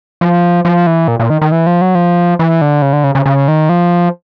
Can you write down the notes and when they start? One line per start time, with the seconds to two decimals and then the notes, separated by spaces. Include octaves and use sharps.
0.21 F3
0.65 F3
0.87 E3
1.08 A#2
1.20 A#2
1.30 D#3
1.41 D#3
1.52 E3
1.67 F3
1.81 F#3
1.95 F3
2.39 E3
2.61 D3
2.82 C#3
2.93 D3
3.04 C#3
3.15 C#3
3.26 C#3
3.48 D#3
3.69 F3